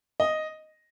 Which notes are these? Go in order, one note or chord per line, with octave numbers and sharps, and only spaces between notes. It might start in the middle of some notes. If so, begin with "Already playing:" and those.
D#5